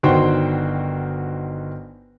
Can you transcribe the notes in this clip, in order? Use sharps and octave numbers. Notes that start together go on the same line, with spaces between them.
G1 D#3 F#4 C5 G5